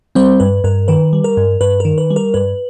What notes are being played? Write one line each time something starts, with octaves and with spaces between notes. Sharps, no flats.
G3 C4 C5
G2 B4
G2 A#4
D#3 B4
G3
A#4
G2
G2 B4
D#3 A#4
B4
G3
A#4
G2 B4